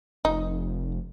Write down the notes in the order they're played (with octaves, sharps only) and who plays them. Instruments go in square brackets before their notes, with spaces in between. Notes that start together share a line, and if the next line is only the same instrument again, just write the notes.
[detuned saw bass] F1 [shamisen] D#4